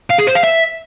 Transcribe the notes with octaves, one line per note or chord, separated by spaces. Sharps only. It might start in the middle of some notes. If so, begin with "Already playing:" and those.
F5
G#4
C5
F5
E5